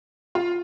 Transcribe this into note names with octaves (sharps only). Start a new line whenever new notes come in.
F4